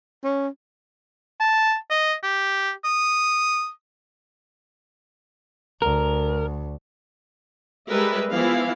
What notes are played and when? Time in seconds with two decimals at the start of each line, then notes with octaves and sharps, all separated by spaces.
0.24 C#4
1.40 A5
1.90 D#5
2.23 G4
2.84 D#6
5.82 D2 A#4
7.89 G3 G#3 A#4 B4 E5
8.32 E3 F3 B3 E4 F5